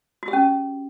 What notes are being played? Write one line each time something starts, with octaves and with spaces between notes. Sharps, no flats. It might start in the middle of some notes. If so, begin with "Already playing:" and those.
F#4
G4
C#4